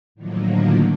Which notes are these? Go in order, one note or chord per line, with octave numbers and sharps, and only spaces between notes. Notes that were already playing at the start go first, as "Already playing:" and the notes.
A2 D3 D#3 F3 F#3 A#3